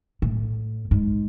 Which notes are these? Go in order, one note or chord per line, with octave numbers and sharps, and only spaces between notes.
A2
G#2